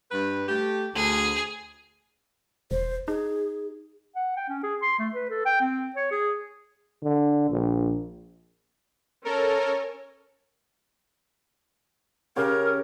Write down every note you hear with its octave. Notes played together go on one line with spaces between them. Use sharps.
G2 B4
A3 G4
D2 G#4
E1 C5
D#4 G#4
F#5
G5
C#4
G#4
C6
A3
B4
A4
G5
C4
C#5
G#4
D3
A#1
C#4 A4 A#4
C#3 G4 A#4 C#5